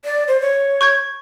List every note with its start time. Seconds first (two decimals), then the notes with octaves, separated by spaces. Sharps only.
0.05 D5
0.28 C5
0.41 C#5
0.81 C#6 G6 G#6